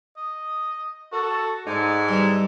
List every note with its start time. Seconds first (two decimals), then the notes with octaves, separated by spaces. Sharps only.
0.17 D#5
1.12 F#4 A4
1.67 G#2 G#3 D#4 A4 D5
2.08 E3 G3